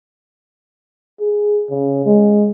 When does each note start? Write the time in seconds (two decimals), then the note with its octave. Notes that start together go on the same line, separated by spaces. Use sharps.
1.20 G#4
1.70 C#3
2.06 G#3